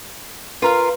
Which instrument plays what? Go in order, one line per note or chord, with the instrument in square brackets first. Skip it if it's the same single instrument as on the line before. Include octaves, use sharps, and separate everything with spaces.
[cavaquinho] F4 A#4 F5 [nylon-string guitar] B4